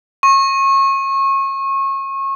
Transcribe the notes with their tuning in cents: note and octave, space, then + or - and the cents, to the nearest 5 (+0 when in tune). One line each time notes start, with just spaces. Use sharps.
C#6 -30